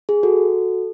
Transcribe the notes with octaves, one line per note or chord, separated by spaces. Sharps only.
G#4
F#4 A4